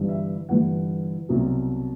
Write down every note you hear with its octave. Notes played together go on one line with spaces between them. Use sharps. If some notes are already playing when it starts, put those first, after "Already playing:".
Already playing: G1 G2 E3 G3
E5
G1 G2 E3 G3 F#5
C2 B2 F#3